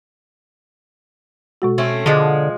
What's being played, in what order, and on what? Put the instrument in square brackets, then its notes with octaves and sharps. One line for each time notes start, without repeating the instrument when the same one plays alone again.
[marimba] B2 G#3 F#4
[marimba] B2 [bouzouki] A3 C4 C#4
[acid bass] D3 [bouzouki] F3 G#3 [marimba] A5